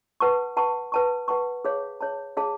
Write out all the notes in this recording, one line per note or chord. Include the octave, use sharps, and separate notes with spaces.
B4 F#5 A5 C#6
B4 F#5 A5 C#6
B4 F#5 A5 C#6
B4 F#5 A5 C#6
G#4 C#5 F5 A5
G#4 C#5 F5 A5
G#4 C#5 F5 A5